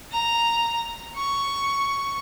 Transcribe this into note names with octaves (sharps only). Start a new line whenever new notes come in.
A#5
C#6